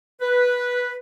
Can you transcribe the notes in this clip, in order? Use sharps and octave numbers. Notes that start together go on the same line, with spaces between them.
B4